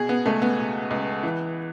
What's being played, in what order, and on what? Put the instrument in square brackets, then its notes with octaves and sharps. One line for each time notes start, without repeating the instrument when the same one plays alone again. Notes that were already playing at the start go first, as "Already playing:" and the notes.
Already playing: [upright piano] B2 G#4
B3
C#2 A3
B3
B2
C#2
E3